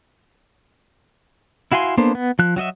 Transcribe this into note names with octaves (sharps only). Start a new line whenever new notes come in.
E4 F#4 F5 G#5 C6
A#3 B3 D4 A4 C5
B3
F3 F#6
F#3 F#4 D#5 E5